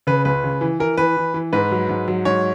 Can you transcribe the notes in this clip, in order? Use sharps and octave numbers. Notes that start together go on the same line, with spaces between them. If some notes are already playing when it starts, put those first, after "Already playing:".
C#3 B4
C#2 B4
C#3
E3
E3 A#4
E3 B4
E3
E3
G#2 B4
F#3
G#2
F#3
G#2 C#5